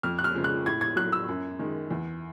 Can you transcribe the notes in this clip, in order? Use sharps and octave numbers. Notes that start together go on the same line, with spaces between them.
F2 F6
F#6
F6
C#3 F3 G#3
F#6
A2 G#6
G#6
F#3 F#6
E6
F#2
D#3 G#3
E2